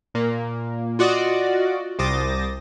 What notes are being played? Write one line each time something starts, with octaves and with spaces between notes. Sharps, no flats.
A#2 A#3
F4 F#4 D5 D#5
C2 C5 D6 D#6 A6 A#6